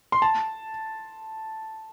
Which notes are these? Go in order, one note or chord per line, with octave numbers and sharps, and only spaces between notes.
C6
A5